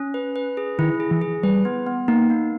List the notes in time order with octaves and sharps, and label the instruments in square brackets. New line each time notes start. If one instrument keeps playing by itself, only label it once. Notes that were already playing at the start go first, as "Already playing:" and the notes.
Already playing: [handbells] C#4
B4
B4
G#4
[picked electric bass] D#3 [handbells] E4
[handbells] G#4
[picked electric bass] E3
[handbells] G#4
[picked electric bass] G3 [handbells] B4
[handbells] B3
B3
[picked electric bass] A#3 [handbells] D#4
[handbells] A#3